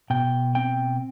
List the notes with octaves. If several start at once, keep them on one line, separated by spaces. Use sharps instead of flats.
B2 G5
C4 G5